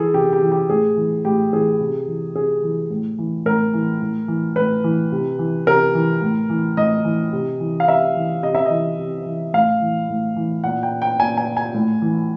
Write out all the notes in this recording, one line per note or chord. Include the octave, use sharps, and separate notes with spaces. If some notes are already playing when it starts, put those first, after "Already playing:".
Already playing: E3 G#4 A4
C3 G4
G4
E3
G4
A2 G#4
E3
A2 G4
E3 G#4
C3
E3
C3 G#4
E3
A2
E3
A2 A#4
E3
A2
E3
A2 B4
E3
C3
E3
C3 A#4
E3
A2
E3
A2 D#5
E3
C3
E3
F5
C3 E5
E3
C3 D#5
E5
E3 D#5
C3
E3
A2 F5
E3
A2
E3
A#2 F#5
G5
G5
A#2 G#5
G#5
G#5
A2
E3